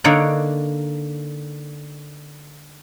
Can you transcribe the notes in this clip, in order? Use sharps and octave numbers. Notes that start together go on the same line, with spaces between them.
D3 A#3 D#4 C#5 D5 F#5